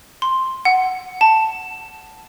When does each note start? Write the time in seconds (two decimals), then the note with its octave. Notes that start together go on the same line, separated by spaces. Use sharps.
0.22 C6
0.65 F#5
1.21 A5